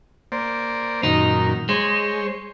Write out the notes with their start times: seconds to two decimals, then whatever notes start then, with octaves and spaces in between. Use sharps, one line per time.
0.32 A#3 C5 D5
1.03 F#2 A#2 D#3 D#4
1.69 G#3 C5 C#5